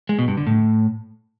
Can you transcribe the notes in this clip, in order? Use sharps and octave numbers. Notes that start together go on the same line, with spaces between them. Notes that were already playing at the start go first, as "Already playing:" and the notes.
G#3
B2
G2
D3
A2